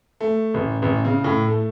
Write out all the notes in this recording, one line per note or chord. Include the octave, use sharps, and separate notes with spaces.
A3
A1
A1
C#3
A2
A3